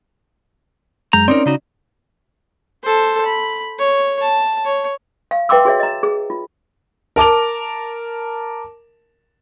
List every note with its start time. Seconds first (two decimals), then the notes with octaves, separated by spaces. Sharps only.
1.13 F#2 G#3 A#5 G6
1.28 C4 C#4 D#4 A#4 D5
1.46 C#3 D#4 F#4
2.83 A4 C5
3.25 B5
3.79 C#5
4.21 A5
4.65 C#5
5.31 F5
5.49 B4 E5 G5 C6 D6 E6
5.65 F#4 G#4 C#5 E5
5.79 D#5 A#5
6.03 G#4
6.30 F4
7.16 A#4 A5 D6 F7